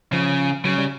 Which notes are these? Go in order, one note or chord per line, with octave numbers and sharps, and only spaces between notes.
C#3 F3
C#3 F#3
G3